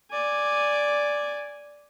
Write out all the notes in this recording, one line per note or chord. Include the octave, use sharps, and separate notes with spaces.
D5 G#5